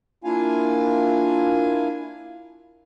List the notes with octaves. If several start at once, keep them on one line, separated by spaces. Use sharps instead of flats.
A#3 D4 E4 F4 F5 G#5